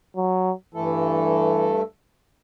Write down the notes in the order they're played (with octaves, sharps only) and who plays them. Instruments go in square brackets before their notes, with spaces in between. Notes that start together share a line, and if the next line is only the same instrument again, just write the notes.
[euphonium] F#3
[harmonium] G2 A3 A4 [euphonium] E3